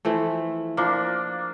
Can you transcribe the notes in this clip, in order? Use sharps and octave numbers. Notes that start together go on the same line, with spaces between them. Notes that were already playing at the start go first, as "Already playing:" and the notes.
E3 F3 A3
F3 A#3 D4